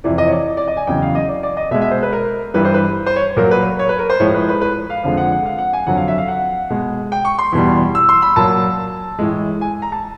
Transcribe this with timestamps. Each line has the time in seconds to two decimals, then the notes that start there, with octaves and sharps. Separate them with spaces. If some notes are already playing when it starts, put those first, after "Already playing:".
0.04 F2 C3 E3 D5
0.18 D#5
0.27 C#5
0.32 D5
0.57 D5
0.68 D#5
0.77 G#5
0.87 E2 C#3 F#3 G5
1.02 F5
1.15 D#5
1.29 D5
1.43 D5
1.57 D#5
1.71 B2 E5
1.74 G#3
1.81 E5
1.91 C5
2.03 B4
2.13 A#4
2.54 G2 E3 G3 B4
2.65 C5
2.74 B4
3.06 C5
3.16 C#5
3.37 A#2 F#3 A#4
3.51 B4
3.79 C#5
3.89 B4
3.99 A#4
4.10 C5
4.20 A2 F3 G#3 C#5
4.34 B4
4.49 B4
4.61 B4
4.90 F5
5.04 F2 D3 F3 G#3 F5
5.17 F#5
5.32 F#5
5.46 F5
5.58 F#5
5.73 G#5
5.86 F2 D3 F#3 F#5
5.97 F5
6.08 E5
6.18 F5
6.28 F#5
6.70 B2 G#3
7.12 G5
7.25 C#6
7.39 C6
7.52 E2 B2 G3
7.95 E6
8.09 C6
8.22 B5
8.36 A#2 F#3 A5
9.19 A2 E3 G#3
9.61 G#5
9.82 A#5
9.92 A5